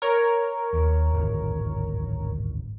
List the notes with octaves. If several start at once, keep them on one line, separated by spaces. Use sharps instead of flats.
A#4 C#5
D#2
D1 G#1 F#2